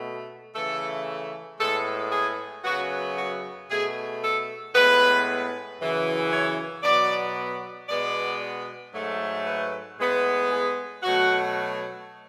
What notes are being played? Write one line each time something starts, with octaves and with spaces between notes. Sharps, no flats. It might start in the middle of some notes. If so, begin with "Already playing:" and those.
Already playing: B2 A3
C#3 E3 A3 A4
A2 G#3 B3 A4
G#4
F#2 C#3 F#3 B3 F#4
F#4
B2 A3 G#4
A4
A2 G#3 B3 B4
F#2 C#3 E3
C#5
B2 F#3 B3 D5
B2 G#3 B3 D5
G#2 F#3 A3
B4
A2 G#3 B3
G#4
B2 F#3 A3 F#4